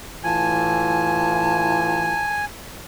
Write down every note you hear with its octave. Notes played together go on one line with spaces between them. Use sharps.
A2 E3 F4 G#5 A5